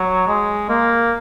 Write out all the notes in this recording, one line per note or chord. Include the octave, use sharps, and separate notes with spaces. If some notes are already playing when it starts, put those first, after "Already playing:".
Already playing: F#3
G#3
A#3